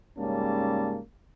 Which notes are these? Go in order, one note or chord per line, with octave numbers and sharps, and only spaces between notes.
G#2 C#3 G3 A#3 C#4 A5